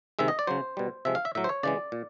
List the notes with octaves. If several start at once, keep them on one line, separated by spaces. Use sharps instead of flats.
C3 D#3 G#3 E5
D#5
D5
C#3 F#3 C5
B2 G3
C3 F3 G#3 E5
F5
E5
A2 F#3 E5
C5
C#5
C#3 E3 G#3 D5
A#2